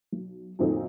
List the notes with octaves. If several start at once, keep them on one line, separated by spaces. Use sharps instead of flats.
B1
F#2 A#2 D#3 C4 D#4 A4